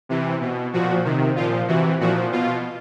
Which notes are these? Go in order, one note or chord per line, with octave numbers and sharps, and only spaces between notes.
C3 E3
B2
A#2 F3 F#4
C3 D#3
A#2 F3 F4
C3 E3 F#4
A#2 F3 F#4
B2 F4